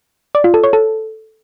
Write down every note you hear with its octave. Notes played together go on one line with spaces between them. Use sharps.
D5
F4
A4
C#5
A4